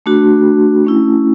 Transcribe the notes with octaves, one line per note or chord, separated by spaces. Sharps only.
A3 D4 F#4
A3 C#4 E4